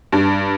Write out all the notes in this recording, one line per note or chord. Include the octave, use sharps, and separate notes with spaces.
G2